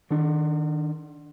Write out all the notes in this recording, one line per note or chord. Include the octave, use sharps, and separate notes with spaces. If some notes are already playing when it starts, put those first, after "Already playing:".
D#3 D4